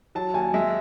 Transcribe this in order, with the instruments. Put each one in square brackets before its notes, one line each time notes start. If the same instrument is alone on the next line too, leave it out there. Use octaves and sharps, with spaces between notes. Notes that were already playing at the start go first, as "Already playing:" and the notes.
[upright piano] F#3 A5
D#2 G#5
G#3 E5